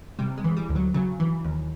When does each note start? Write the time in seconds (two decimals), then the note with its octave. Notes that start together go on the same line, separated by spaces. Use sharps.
0.19 C3 G3
0.38 G#3
0.44 E3
0.57 G3
0.69 D2
0.75 F#3
0.94 C#3 F#3
1.20 E3
1.44 D#2